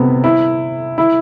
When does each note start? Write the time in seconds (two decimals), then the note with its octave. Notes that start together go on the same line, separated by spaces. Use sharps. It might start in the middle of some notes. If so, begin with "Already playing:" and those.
Already playing: C3 B3
0.24 E4
0.98 E4